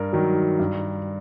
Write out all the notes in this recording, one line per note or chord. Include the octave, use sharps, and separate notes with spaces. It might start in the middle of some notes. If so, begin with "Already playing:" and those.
Already playing: G2 A#4
D#3 F#3
G2